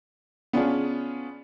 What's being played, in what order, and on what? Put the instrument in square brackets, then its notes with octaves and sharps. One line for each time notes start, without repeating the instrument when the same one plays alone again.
[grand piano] B3 C#4 D4 F4 G#4